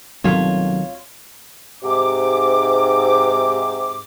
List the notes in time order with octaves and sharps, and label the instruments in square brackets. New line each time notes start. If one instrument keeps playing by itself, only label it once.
[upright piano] C2 B2 [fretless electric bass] D#3 F#3 A3 [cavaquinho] F4 C#5
[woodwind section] G#2 C3 D6